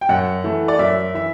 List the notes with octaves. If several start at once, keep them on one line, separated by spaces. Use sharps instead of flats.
G5
F#2 F#5
E3 A3
D5
F#2 E5
E3 E5